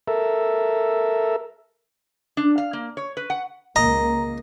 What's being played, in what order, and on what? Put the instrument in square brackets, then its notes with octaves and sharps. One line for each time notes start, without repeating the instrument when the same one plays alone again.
[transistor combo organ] A4 A#4 E5
[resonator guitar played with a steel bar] D4
F5
A#3
C#5
B4
F#5
[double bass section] C#2 A#3 [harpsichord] D#5 [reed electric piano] A#5